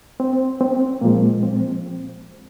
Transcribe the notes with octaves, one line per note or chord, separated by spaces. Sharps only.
C4
C4
A#2 F3 G#3 A#3
C4